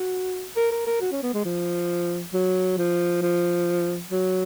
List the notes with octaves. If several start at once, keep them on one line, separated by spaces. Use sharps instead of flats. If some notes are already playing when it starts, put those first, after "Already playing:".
Already playing: F#4
A#4
A#4
A#4
F#4
C#4
B3
G#3
F3
F#3
F3
F3
F#3